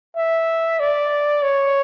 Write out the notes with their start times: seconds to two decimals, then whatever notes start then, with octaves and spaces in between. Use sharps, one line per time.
0.17 E5
0.80 D5
1.43 C#5